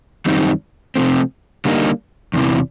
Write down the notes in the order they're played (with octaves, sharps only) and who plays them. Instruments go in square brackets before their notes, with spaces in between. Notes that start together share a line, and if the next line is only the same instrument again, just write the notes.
[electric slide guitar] F#2 D#3 G3 C4 D#4
C3 F3 A3 C4
D3 G3 A#3 D#4
E2 C3 E3